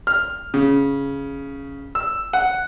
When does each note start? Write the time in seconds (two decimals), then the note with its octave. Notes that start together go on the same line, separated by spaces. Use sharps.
0.07 F6
0.54 C#3
1.95 E6
2.33 F#5